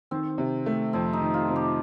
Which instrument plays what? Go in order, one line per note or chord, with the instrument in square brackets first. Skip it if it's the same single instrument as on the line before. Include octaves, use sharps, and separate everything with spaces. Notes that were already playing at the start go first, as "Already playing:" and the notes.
[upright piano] D#3 [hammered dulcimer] C4
[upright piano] C3
A3
[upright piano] F2 [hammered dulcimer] C4
[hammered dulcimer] D#4
[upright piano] D#3
[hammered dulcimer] F4
[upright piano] C3
[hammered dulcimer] G4